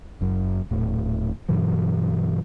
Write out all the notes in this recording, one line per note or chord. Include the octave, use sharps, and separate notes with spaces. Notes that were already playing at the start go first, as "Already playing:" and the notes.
F#1 F#2
D#1 A2
G2 B2 E3 F#3